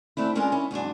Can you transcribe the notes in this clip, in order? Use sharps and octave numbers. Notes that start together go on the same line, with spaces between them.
A3 C4 D4 E4
G#3 C#4 D4 F4 A#4 F#5
C#4 E4
E2 G#2 F#3 D4